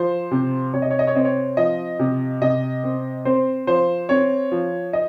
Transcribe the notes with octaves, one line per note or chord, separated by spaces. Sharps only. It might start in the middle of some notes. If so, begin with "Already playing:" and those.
Already playing: F3 C5
C3
C3 C#5
D#5
C#5
D#5
C#5
C4 D#5
C#5
F3 D#5
C3
C3 D#5
C4
C4 C5
F3 C5
C4 C#5
F3
D#5